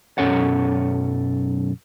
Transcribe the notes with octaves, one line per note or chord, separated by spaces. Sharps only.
B1 F#2 C#4 A4 C#5 F#5